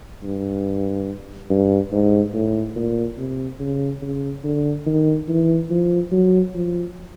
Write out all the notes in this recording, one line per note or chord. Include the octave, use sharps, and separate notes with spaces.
G2
G2
G#2
A2
A#2
C3
C#3
C#3
D3
D#3
E3
F3
F#3
F3